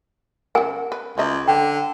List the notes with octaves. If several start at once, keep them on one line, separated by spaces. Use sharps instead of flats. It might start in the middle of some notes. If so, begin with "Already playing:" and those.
C#3 A#4 F#5 G#5
B4
C#2 F#3 D#5
D3 G5